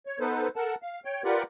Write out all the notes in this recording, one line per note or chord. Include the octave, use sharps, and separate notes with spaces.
C#5
B3 D#4 A4 B4 C5
A4 A#4 F#5 A5
F5
C#5 G5
F4 G4 A#4 B4 D5 F#5